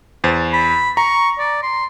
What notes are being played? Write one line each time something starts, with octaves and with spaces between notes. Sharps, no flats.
E2 C5 A6
B5
A#5 C#6
D5
C6